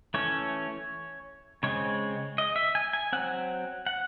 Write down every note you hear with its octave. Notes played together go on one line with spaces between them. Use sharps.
E3 A3 C#4 C#5
C#3 G#3 C4 C#5
D#5
E5
G#5
G#5
F#3 C4 F#5
F#5